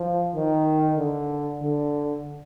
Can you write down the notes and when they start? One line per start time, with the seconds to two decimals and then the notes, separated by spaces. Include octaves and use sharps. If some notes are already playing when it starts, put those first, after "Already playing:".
Already playing: F3
0.35 D#3
0.98 D3
1.61 D3